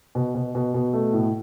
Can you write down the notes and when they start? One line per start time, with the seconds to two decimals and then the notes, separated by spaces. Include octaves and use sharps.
0.15 B2
0.35 B2
0.55 B2
0.74 B2
0.93 A3
1.13 A2